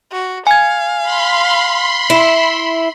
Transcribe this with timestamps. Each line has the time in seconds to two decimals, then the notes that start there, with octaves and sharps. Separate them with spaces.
0.12 F#4
0.47 F5 G#5 G#6
1.02 B5 C6
2.10 E4